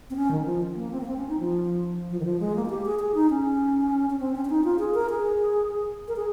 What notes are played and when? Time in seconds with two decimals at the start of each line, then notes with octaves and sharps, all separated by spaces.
0.10 C4
0.16 C#4
0.31 D#3
0.45 F3
0.76 A#3
0.91 C4
1.01 A#3
1.06 C4
1.17 C#4
1.28 D#4
1.40 F3
2.10 F3
2.20 D#3
2.25 F3
2.40 G#3
2.56 A#3
2.65 F4
2.70 G4
2.86 G#4
2.99 G#4
3.15 D#4
3.30 C#4
4.10 C#4
4.20 C4
4.35 C#4
4.45 C#4
4.50 D#4
4.64 F4
4.79 G#4
4.94 A#4
5.10 G#4
6.08 A#4
6.16 G#4